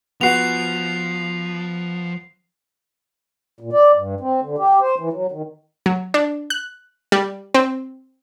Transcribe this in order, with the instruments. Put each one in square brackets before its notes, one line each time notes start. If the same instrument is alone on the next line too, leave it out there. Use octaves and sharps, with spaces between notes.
[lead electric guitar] F3 [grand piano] B3 F#4 [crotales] C7 F7
[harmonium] A#2
D5
G2
C4
D3
G4
C5
E3
F#3
D#3
[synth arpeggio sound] F#3
D4
F#6
G3
C4